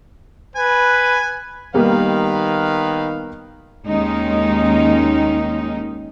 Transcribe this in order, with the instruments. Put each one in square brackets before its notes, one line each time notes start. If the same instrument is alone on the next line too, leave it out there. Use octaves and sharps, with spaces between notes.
[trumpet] B4 [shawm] G#5
[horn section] D#3 B4 F5 [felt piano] G3 A#3 B3
[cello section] D#2 D#3 G#3 C#4 D#4